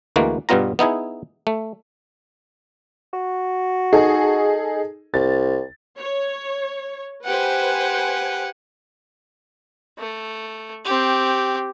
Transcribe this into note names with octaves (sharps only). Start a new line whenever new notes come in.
D2 E3 G#3 A#3 F#4
G2 B2 G3 B3 F4 A#5
B3 D#4 E4 G#4
A3
F#4
D#4 G#4 A4
C2 A6
C#5
G4 B4 C5 F#5 G#5
A3
C4 G4